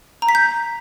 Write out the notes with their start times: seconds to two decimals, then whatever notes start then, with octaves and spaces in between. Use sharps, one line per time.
0.22 A#5
0.29 B6
0.35 G6